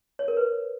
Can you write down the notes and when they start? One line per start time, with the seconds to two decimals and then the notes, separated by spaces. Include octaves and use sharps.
0.19 C#5
0.28 A#4
0.37 B4